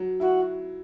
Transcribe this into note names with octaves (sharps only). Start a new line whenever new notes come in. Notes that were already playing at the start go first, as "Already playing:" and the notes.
Already playing: F#3
E4 F#4